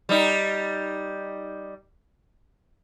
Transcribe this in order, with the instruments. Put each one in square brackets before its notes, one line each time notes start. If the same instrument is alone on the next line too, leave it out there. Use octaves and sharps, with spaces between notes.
[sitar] G3 D#4